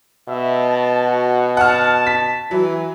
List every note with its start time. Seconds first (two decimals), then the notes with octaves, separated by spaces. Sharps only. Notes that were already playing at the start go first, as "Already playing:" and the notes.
0.29 B2 E5
0.67 A5
1.06 F#4
1.57 F#5 A5 F6
2.07 B6
2.51 E3 F#3